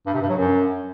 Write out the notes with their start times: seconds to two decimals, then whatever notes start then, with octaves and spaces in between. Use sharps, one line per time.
0.07 G2
0.14 C3
0.22 G2
0.29 F#3
0.37 F#2